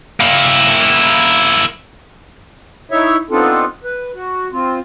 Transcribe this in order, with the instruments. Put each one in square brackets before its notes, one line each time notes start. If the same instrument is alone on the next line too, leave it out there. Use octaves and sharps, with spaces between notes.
[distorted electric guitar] A#3 E4
[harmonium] D#4 E4 C#5 E5
B3 C4 D4 D#4 F4 A4
B4
F#4
C4 F4